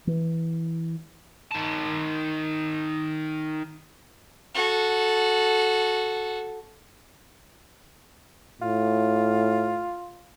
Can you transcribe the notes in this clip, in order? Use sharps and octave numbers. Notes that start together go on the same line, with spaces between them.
E3
D#3 A5
F#4 A4
A2 F4